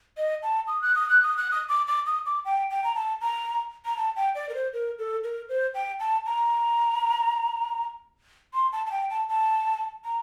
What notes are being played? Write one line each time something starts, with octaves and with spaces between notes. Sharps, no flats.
D#5
A5
D#6
F#6
D#6
F#6
D#6
F#6
D#6
D6
D6
D#6
D6
G5
G5
A#5
A5
A#5
A#5
A5
G5
D5
A#4
C5
A#4
A4
A#4
C5
G5
A5
A#5
C6
A5
A5
G5
A5
A5
A#5